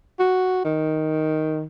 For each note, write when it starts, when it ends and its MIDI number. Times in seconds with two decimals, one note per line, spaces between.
0.20 0.63 66
0.65 1.64 51